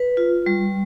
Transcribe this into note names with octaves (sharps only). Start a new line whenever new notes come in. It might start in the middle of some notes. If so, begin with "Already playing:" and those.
Already playing: B4
F4
G3